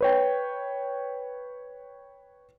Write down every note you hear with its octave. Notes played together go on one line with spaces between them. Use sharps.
B4 C#5 G5